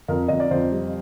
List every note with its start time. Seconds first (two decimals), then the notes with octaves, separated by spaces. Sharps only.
0.08 F2 A#4
0.28 F2 D#5
0.40 D5
0.51 F2 C5
0.72 G3